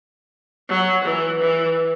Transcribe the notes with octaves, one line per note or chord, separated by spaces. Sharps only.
F#3
E3
E3